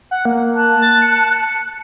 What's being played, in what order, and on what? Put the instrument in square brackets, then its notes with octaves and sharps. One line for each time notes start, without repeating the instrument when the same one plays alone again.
[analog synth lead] F#5
A#3
[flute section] A5 F#6
[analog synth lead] A6
C#7